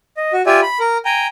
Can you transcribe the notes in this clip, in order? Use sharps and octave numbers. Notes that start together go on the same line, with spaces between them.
D#5
F#4
F4 G4 D5 E5 G#5
B5
A#4
G5 G#5 A#5